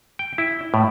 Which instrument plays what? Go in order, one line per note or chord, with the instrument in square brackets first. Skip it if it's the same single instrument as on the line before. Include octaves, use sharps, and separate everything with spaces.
[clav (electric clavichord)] G5
E4
A2